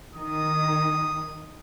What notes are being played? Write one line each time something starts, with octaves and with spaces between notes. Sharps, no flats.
D#3 D#6